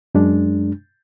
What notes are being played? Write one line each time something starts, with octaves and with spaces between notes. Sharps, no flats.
F#2 G#3 D4